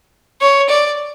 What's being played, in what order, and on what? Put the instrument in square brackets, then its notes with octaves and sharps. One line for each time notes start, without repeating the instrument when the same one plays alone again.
[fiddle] C#5
D5